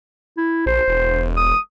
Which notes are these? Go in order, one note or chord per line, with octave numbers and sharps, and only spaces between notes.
E4
A#1 C5
E1
D#6